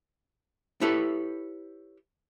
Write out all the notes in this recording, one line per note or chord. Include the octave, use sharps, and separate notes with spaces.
E4 G4 A4 B4 C#5